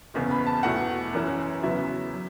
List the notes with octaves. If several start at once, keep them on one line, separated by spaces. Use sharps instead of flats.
F#1 E2 C#3 E3 B3
B5
A5
E2 B2 A3 E4 F#5
F#2 E3 C#4 E4
E2 C#3 F#3 B3 E4 E5
F#3